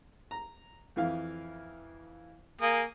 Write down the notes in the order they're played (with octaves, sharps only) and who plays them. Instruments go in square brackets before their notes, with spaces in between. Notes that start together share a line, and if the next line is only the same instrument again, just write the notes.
[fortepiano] A#5
F2 E3 F5
[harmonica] A#3 G#4 D#6